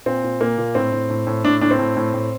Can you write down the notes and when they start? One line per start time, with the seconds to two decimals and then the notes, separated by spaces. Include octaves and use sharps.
0.06 A#2 C4
0.24 A#2
0.41 A#2 A#3
0.58 A#2
0.75 A2 C4
0.92 A2
1.10 A2
1.27 A2
1.45 A2 D4
1.61 A2 D4
1.71 C4
1.79 A2
1.97 A2
2.14 A2